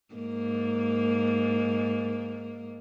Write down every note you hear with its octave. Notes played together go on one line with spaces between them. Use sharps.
G#2 A#3